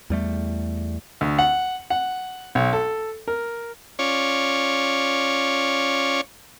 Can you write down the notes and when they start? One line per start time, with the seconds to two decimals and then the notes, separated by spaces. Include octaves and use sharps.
0.10 E2 G3 A3
1.21 D2
1.39 F#5
1.90 F#5
2.55 B1
2.73 A4
3.28 A#4
3.99 C#4 F4 C#5 D5